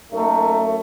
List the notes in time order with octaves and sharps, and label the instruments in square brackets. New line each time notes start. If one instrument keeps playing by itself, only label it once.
[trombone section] F#2 A3 [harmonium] A#3 D#4